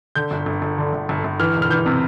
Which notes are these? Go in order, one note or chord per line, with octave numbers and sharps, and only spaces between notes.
D3 G6
G1
G1
G1
D3
G1
G1
G1
E3 F6
E1
F6
E3 G6
C3